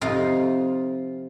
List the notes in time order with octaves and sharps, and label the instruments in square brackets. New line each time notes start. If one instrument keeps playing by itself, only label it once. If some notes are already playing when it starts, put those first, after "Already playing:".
[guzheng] F2 C3 D#4 F4 F5